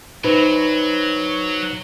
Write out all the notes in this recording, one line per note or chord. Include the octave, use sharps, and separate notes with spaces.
F#3 D#4 B4 C5